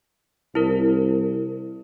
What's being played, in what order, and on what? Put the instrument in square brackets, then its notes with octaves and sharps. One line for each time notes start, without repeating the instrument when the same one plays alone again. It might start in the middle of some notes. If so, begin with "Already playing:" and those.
[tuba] C2 [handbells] E4 A#4